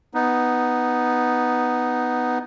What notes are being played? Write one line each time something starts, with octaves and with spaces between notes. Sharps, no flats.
B3 D#4